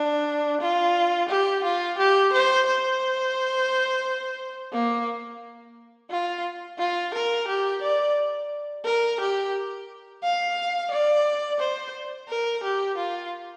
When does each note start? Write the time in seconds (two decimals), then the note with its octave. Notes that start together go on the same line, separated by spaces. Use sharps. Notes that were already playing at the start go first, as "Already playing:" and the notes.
Already playing: D4
0.61 F4
1.29 G4
1.64 F4
1.98 G4
2.33 C5
2.67 C5
4.73 A#3
6.10 F4
6.79 F4
7.14 A#4
7.48 G4
7.82 D5
8.85 A#4
9.20 G4
10.23 F5
10.91 D5
11.60 C5
12.29 A#4
12.63 G4
12.97 F4